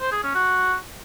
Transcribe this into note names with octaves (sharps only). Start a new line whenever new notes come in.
C5
G#4
C#4
F#4